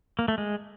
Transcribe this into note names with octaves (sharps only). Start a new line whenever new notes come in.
A#3
A3
G#3